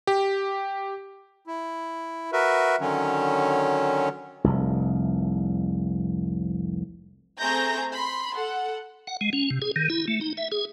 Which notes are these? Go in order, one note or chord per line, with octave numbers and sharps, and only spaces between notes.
G4
E4
F#4 A#4 B4 E5
D3 D#3 F#3 C#4
F1 C2
A3 C4 G#4 A#5 G6 A#6
B5 C6
A4 F#5
F#5
G#3
C#4
C3
G#4
D#3
E4
A3
D#4
E5
G#4